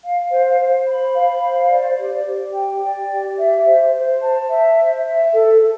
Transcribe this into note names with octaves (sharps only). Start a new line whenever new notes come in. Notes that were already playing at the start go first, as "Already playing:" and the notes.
F5
C5
C5
B5
F5
C5
D5
G4
G4
G5
D5
G4
E5
C5
C5
A5
E5
C5
E5
A4
A4